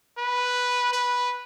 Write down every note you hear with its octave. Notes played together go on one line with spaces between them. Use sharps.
B4
B4